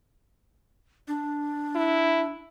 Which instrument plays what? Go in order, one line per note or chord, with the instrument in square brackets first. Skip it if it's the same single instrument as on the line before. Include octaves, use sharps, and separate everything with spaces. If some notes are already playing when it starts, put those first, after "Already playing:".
[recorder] D4
[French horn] E4